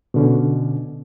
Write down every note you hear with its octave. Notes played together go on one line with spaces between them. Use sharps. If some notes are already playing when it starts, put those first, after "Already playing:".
B2 D3 C#4